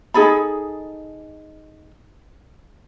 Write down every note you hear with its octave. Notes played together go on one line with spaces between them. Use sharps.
D#4 G#4 A4 B5